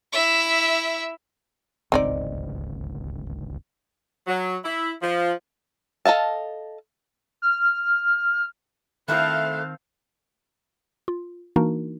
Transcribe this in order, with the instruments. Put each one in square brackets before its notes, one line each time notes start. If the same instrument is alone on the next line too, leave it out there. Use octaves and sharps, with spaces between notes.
[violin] E4 E5
[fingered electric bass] D1 G#1 C#2 [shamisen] C4 D#4 D5
[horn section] F#3
E4
F3
[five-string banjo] A4 D#5 F5 A5
[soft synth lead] F6
[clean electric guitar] D#3 C4 [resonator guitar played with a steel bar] A3 E4 [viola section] C5 F5 A5 [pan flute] F#6
[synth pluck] F4
E3 A#3 D4 D#4 F#4 A#4